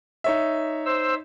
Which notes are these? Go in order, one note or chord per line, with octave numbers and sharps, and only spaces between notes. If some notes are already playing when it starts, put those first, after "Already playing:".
D#4 C#5 E5
C5 E6